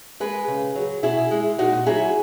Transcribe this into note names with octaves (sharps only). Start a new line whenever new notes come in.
G#3 G#4 B4
C#3
F#3
B2 E4 G#4
G#3
A#2 D#4 F#4
F#3 E4 G#4